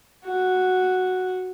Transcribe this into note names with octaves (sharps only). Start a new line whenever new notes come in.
F#4